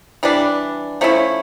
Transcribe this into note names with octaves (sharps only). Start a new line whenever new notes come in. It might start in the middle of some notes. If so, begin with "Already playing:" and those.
E3 G3 D4
F3 A3 C#4 E4